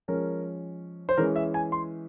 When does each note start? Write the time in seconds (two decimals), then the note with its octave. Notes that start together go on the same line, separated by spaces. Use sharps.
0.08 F3 G#3 C#4 A#4
1.09 C5
1.17 E3 G#3 C#4 A#4
1.36 E5
1.54 G#5
1.72 C6